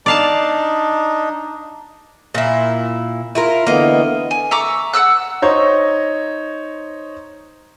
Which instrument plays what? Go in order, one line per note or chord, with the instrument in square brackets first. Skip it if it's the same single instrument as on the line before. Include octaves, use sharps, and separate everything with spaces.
[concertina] D4 D#4 [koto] D5 F5 A5
[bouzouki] A#2 E4
E4 F4 A#4
[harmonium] D3 E3 B3 [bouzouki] A#3 D#5
[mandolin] G#5
E5 A#5 C#6 D6
F#5 A#5 E6 F#6
[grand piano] D#4 C5 C#5 A#5